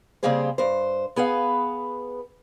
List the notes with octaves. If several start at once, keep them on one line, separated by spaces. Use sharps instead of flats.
C#3 G3 A#3 C4 G#4 C5
G2 C5
B3 G#4 B4 F5